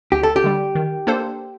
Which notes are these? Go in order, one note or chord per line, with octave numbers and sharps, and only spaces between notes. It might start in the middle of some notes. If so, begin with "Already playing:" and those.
D2 G4
A4
G4
D3 G3
D#3
A#3 D4 A4 C5